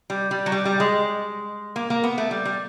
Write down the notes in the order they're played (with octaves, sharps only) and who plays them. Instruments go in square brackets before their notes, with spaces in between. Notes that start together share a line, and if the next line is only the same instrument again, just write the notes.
[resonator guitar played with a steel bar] G3
G3
F#3
G3
G3
G#3
A#3
A#3
B3
A3
G3
G3